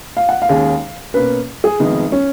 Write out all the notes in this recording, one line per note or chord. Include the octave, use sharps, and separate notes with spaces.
F5
F#5
F5
D#2 D#3 G#3 C#4 G#4
B2 A#3 C#4 B4
G#4
F1 F2 D#3 G#3 B3 D#4
C#4